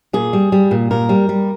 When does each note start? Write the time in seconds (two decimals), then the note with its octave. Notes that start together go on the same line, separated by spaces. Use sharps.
0.13 A#2 G#4
0.33 G3
0.52 G3
0.71 A#2
0.91 A#2 A#4
1.09 G3
1.29 G3